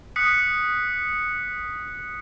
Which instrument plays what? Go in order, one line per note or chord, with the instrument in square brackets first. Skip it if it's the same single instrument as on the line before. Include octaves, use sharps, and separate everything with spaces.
[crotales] D#6 F#6 B6 C#7